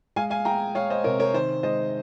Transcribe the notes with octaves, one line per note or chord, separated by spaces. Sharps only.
G#3 F5 G#5
F5 G#5
G#3 G5 A#5
G#3 C#5 F5
C5 D#5
C3 A#4 C#5
A#4 C#5
D#3 C5
G#3 C5 D#5